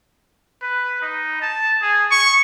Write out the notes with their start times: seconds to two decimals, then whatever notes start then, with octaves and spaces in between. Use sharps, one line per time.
0.62 B4
1.02 D#4
1.42 A5
1.82 G#4
2.11 C#6